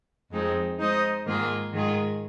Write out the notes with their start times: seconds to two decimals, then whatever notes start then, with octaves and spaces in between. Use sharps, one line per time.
0.31 F2 F3 G#3 C4 D#4
0.79 G#3 D#4 C5 D#5
1.26 G#2 D#3 A#3 F4 G#4
1.73 G#2 D#3 G#3 F4 G#4